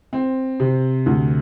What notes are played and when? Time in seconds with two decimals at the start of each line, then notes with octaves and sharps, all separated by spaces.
0.13 C4
0.60 C3
1.06 D2